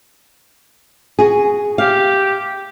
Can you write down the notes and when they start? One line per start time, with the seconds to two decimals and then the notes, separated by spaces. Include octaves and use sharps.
1.19 F#4 G#4
1.78 G4 F5